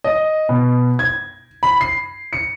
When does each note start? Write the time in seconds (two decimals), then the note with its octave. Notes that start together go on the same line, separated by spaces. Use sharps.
0.04 D#5
0.49 B2
0.99 G#6
1.63 B5
1.81 C7
2.33 C#7